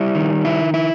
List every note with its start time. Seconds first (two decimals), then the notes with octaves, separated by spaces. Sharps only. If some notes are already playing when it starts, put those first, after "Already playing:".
Already playing: G3 E4
0.15 D#3
0.45 E4
0.74 E4